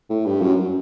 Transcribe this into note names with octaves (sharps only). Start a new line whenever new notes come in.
A2
G2
F#2